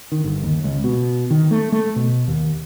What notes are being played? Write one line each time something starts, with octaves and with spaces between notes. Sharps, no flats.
D#3
G1
D#2
C#2
B2
D#3
A3
A3
B2
D#2